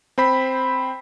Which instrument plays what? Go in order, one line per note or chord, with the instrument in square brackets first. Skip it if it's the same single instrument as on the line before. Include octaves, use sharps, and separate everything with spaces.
[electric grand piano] C4 C5 B5 B6